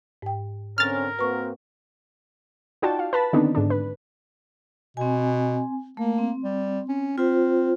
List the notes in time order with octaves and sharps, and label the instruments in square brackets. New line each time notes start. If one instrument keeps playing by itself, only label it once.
[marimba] G#2 G5
[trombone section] D3 C4 C#4 [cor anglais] A#4 [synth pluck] F6 A6
[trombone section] A#3 C4 F#4 [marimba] B4 C#6
[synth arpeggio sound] D#4 F4 F#4 D5 G5 A5
F5
B4 A5 B5
D3 D#3 B3 C4 D4 D#4
G#2 D3 D4
B4
[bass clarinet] B2 [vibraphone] C4 G#5
[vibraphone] A3 A#4 [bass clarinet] A#3
[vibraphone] C4
[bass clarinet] G3
C#4
[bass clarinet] C4 [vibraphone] F4 C5